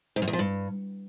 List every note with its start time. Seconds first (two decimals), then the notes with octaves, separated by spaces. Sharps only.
0.16 G#2
0.22 F#2
0.28 E2
0.33 F3
0.39 G2